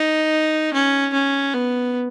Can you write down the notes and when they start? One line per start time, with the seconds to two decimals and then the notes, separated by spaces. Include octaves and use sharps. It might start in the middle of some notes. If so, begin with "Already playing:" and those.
Already playing: D#4
0.74 C#4
1.14 C#4
1.54 B3